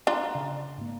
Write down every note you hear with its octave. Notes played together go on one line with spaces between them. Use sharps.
D4 F4 A#5
C#3
G#2 A#3